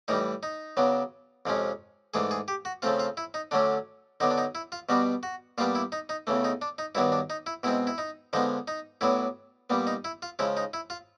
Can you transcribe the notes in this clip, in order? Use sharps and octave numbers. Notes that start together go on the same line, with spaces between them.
A2 E3 G3 D#4
D#4
C#3 F#3 B3 D4
F2 C3 F3 G#3 C#4
G#2 E3 A3 D4 G#4
G#4
G4
F#4
C#3 F3 A3 C4 F4
F4
E4
D#4
D3 F#3 A3 C#4 D4
D3 F#3 B3 D4 D#4
D4
D#4
E4
F4
B2 G3 B3 D4 F#4
F#4
A#2 G3 B3 D4 F4
E4
D#4
D#4
E2 C#3 E3 A3
D#4
D4
D#4
G2 D#3 F#3 B3 D4 E4
D4
D#4
E4
B2 G#3 C4 E4
E4
D#4
D3 F3 G#3 B3 D#4
D#4
A2 F#3 B3 D4 E4
A#2 G3 B3
D#4
E4
F4
C#3 F3 G#3 E4
D#4
E4
F4